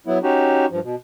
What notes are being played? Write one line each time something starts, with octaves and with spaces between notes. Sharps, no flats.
F#3 B3 E4
C#4 D#4 F#4 G4
G2 F3
B2